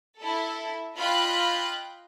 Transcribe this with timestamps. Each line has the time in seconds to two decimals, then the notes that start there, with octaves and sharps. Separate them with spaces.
0.19 E4 A4
0.97 F4 D#5 G5 B5 F#6